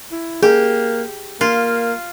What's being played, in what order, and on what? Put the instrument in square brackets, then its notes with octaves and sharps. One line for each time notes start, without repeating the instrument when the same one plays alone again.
[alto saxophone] E4
[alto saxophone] A#3 [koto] G4 [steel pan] G#4
[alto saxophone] A#3 [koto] F4